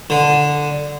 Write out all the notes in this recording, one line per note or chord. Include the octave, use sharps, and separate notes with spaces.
D3